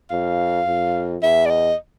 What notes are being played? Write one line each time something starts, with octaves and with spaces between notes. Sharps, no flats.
F2 F5
F2
E2 E5
D5
D#5